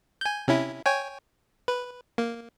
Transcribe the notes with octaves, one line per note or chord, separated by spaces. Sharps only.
G#5 G6
C3 C#4 E4
C#5 G5 G#5
B4
A#3